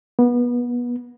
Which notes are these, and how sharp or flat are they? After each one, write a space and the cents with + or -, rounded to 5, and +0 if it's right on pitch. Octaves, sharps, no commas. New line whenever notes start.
B3 -25